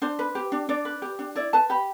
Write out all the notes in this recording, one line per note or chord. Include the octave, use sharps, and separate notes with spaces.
D4 C5
B4
G4
D4
D4 D5
B4
G4
D4
E4 D5
B4 A5
G4 B5